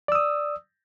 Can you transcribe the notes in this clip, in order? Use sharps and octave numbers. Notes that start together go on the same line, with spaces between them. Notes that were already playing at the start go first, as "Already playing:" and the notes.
D5 D#6 E6